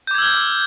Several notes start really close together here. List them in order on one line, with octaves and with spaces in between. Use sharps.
G6 D6 G#6 E6 F6